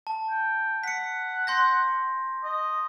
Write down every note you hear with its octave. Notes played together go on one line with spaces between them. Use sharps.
A5
G5
F#5 B6 C#7
C6 G6 A#6
D#5